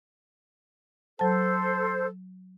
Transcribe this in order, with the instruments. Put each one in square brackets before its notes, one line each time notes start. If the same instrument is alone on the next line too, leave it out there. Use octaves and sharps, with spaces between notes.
[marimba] F#3 A5 [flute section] A4 C5